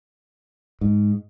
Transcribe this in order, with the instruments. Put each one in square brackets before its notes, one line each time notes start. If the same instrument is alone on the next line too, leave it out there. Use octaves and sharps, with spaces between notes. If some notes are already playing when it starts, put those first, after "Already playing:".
[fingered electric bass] G#2